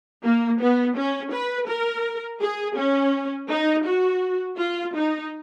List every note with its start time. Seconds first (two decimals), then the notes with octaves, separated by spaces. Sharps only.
0.24 A#3
0.60 B3
0.96 C#4
1.32 B4
1.68 A#4
2.41 G#4
2.77 C#4
3.50 D#4
3.86 F#4
4.58 F4
4.95 D#4